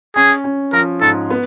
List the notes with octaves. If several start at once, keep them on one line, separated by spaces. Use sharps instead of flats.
C#4 G#4
C#4
F3 A#4
G#2 A4
B3